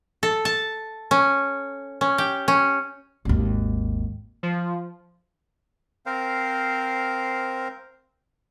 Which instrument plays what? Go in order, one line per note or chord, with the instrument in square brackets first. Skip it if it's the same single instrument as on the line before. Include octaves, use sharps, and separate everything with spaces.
[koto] A4
A5
C#4
C#4
G4
C#4
[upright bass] G#1 D#2
[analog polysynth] F3
[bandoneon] C4 A#4 C5 F5